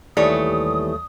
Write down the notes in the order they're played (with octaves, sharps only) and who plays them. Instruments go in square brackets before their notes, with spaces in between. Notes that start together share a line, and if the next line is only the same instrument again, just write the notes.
[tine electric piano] D#2 E3 G3 [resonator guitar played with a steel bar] A3 C#5 [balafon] D5 [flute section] D#6